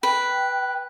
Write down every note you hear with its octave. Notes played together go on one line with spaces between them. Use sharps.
B4 G5